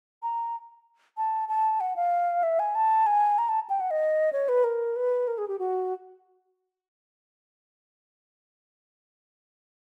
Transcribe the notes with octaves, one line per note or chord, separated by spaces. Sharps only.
A#5
A5
A5
F#5
F5
E5
G#5
A5
G#5
A#5
A5
G5
F#5
D#5
C#5
B4
A#4
B4
A#4
G#4
G4
F#4